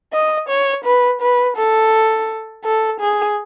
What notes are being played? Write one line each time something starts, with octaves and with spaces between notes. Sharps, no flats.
D#5
C#5
B4
B4
A4
A4
G#4